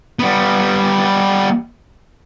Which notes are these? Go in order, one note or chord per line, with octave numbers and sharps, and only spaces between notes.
G3 B3